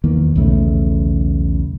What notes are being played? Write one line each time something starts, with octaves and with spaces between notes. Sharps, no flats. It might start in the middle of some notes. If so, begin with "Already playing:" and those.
E2 D#3 A#3
B1 E2 C#3 A3